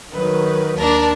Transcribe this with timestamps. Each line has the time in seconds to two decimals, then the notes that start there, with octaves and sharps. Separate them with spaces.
0.13 D#3 F#3 B4
0.77 D#2 D4 A#4 A5